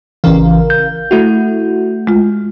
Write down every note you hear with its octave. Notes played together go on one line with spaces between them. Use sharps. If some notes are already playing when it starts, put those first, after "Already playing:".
A1 C#3 E3 A#4 F5
G6
A3 E4 F#4
G#3 F4